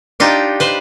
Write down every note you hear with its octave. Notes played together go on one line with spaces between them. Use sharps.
D4 D#4 F4 G4
B4 C5